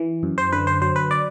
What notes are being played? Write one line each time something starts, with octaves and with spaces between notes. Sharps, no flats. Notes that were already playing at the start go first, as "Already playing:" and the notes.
Already playing: E3
F#2
C5
D3 B4
C5
F#3 C5
B4
D5